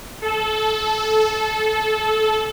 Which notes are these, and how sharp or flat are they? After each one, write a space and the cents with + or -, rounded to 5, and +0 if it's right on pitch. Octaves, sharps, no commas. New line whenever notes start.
A4 -20